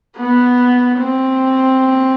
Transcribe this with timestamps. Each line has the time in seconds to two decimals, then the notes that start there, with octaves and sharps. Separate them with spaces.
0.18 B3
1.00 C4